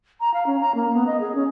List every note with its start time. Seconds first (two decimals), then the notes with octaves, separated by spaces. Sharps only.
0.20 A#5
0.34 F5
0.46 C#4
0.60 A#5
0.75 A#3
0.94 B3
1.07 D#5
1.20 G#4
1.35 C#4